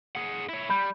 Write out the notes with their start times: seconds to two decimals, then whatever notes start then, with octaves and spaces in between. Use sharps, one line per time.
0.15 G#4 F#5
0.49 E4 C#5
0.70 G3 B5 G6